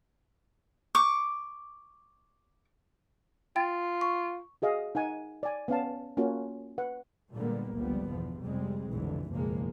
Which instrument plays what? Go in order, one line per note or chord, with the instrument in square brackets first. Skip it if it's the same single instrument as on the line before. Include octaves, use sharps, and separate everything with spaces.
[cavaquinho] C#6 D6
[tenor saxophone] F4 [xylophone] G5 A6
[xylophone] C#6
[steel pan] F#4 G#4 D#5 F5
D#4 F#5 G#5
D5 G#5
B3 C#4 F5 A5
A#3 C#4 F4 F#4
B4 F#5
[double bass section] A#2 D3 G3 G#3 A#3 B3
G1 C#2 F3 G3 B3
E2 B2 F3
F2 C3 G3 G#3 C4
F1 B1 D3 E3
F#1 B1 E2 F3 G#3 A#3